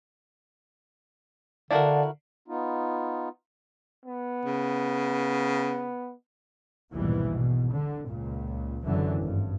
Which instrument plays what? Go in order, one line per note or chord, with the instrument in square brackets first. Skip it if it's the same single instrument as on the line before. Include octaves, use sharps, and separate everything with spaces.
[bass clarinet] D3 [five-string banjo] E4 F#4 A#4 [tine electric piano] D5 F5 A5
[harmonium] B3 D#4 F4
[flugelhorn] B3
[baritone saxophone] C#3
[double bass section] A#1 D#2 G#2 B2 E3 G3
G#2 B2
D3
C#2 A#2
F#1 F#2 D3 E3
G#1 G2